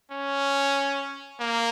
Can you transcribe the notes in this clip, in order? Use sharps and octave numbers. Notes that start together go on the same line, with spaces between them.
C#4
A#3